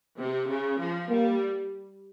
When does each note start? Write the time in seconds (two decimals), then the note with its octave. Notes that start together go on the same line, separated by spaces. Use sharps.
0.17 C3
0.48 C#3
0.78 F3
1.09 G3 A#3